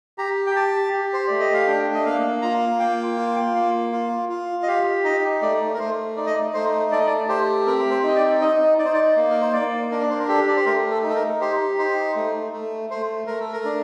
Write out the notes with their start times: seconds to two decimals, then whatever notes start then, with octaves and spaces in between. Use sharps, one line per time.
0.18 G4 A#5
0.47 G5
0.55 G4 A5
0.93 G4
1.13 C5
1.27 A3 D5
1.40 D#5
1.54 F5
1.67 D4 G5
1.94 D#5
2.05 A#3 F5
2.42 F4 A#5
2.79 A#3 G5
3.17 F4
3.55 A#3
3.92 F4
4.29 F4
4.63 D#5
4.68 G4 F5
5.04 D#4 D#5
5.42 A3 D5
5.74 A#4
5.79 A3 C5
6.16 D#4 D5
6.26 D#5
6.36 D5
6.54 A3 C5
6.91 A3 D5
6.99 D#5
7.07 D5
7.28 G4 C5
7.66 C4 A#4
7.91 C5
8.03 D#4 D#5
8.16 D5
8.41 D#4 D#5
8.78 D#4 D5
8.85 C5
8.94 D5
9.17 A#3
9.30 A#4
9.41 C5
9.53 A#3 D5
9.91 D4 A#4
10.01 D5
10.10 C5
10.19 A#4
10.28 G4 A4
10.48 D5
10.56 C5
10.66 A3 A#4
10.91 A4
11.03 D#4
11.10 A4
11.16 A#4
11.41 G4 C5
11.78 D#4 C5
12.16 A3
12.52 A3
12.90 A3 C5
13.27 A3 A#4
13.40 A4
13.52 A#4
13.65 D4